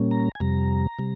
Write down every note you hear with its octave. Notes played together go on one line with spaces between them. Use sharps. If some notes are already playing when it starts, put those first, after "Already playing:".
Already playing: A#2 G3 A#3 C#4
A#5
G#5
F2 C3 G3 A#5
C3 G3